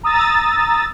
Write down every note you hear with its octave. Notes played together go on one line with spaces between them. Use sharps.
A#5 D#6 E6 A6